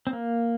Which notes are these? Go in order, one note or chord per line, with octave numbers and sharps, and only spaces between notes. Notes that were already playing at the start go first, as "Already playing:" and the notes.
C4
A#3